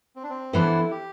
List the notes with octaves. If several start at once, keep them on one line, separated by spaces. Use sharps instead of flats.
C4
D4
C4
E3 B3 D4 E4 A4 C5
G4